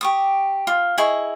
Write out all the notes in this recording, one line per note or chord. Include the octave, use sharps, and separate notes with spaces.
G4 C#6 D#6
F4
E4 G#4 D#5 C#6